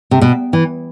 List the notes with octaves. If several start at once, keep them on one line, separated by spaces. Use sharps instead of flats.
C3
B2
E3